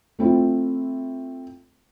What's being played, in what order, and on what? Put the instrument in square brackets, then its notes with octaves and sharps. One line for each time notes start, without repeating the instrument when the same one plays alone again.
[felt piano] A3 C4 E4 F4